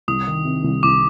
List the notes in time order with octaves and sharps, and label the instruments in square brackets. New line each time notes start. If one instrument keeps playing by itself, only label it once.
[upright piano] C2 [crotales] D#6
[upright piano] D#3
C3
C2
[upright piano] C2 [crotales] D6